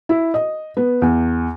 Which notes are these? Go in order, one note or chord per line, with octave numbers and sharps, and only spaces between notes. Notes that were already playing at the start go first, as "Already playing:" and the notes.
E4
D#5
B3
E2